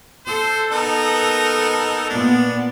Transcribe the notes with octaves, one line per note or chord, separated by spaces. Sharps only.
A4 C5
B3 D#4 A#4
A#2 B3 D4